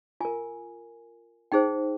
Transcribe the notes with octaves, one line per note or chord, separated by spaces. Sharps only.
F4 A#4 G#5
D#4 G#4 C5 G5